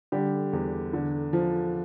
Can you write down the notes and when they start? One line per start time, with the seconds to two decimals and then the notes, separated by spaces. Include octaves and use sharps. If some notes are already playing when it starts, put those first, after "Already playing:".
0.12 D3 G3 G4
0.53 E2
0.93 D3
1.33 F3